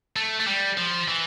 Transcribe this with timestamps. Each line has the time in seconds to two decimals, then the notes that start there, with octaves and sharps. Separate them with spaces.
0.16 A3
0.40 A3
0.47 G3
0.77 F3
1.08 E3